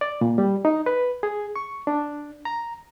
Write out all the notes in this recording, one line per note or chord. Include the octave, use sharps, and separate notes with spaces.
D5
A#2
G3
D#4
B4
G#4
C#6
D4
A#5